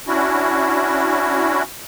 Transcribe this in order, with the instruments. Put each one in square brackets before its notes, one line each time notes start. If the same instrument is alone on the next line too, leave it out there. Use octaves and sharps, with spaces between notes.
[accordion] C#4 D4 E4 F#4